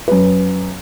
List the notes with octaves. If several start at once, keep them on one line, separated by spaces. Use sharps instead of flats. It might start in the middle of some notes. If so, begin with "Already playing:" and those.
F#2 B4